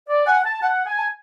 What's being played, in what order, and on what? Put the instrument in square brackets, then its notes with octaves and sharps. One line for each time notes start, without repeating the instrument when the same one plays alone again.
[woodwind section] D5
[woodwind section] F#5 [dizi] G#5
[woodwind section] A5
[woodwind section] F#5 [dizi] A5
[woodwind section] G#5
[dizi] A5